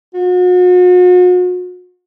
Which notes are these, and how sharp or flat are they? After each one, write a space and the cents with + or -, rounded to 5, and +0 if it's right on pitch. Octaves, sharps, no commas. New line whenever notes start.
F#4 -40